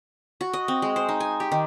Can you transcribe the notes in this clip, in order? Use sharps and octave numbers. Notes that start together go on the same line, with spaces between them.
F#4
D#5
C4
G#3
C5
D#4
G#5
G4
D#3